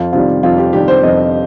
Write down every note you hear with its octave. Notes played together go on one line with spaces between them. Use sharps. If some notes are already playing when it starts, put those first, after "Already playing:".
Already playing: F2 F4
C3 D#3 G3 F4
F2 F4
G4
C3 D#3 G3 G4
C5
F2 D#5